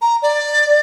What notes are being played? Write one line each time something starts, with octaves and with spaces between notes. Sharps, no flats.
A#5
D5